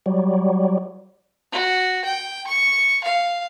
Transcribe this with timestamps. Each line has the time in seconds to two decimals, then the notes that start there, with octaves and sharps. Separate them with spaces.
0.06 F#3 G3
1.52 F#4
2.05 G5
2.47 C#6
3.04 F5